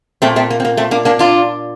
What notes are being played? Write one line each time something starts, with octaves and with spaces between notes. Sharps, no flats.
A#2 A3 C4
A3 C4
A#3
C4
A#3
A3 C4
A#3 D4
A#3 D4
D4 F4